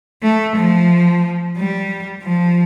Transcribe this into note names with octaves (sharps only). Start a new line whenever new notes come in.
A3
F3
G3
F3